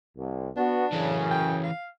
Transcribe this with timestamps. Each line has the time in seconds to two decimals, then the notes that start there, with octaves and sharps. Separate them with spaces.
0.17 C2
0.57 B3 D4 F#4
0.92 F#2 C#3 E3 C#4
1.31 G5
1.63 F5